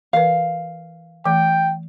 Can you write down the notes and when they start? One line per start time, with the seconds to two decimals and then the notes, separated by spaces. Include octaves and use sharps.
0.13 E3 A#4 B4 F5
1.25 E3 A3 G5